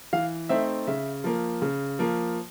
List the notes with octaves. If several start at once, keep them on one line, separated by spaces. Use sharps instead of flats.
E3 F5
A3 C4 D#4 E5
C#3 E5
F3 A#3
C#3
F3 A#3